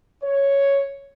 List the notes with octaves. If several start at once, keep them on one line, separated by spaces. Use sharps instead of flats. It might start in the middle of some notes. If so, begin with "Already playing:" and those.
C#5